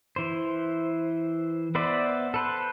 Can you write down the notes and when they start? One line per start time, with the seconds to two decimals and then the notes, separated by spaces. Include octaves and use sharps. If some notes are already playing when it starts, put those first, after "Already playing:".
0.16 E3 C5
1.75 B3 B4 C5 D5 E5
2.34 A4 B4 C5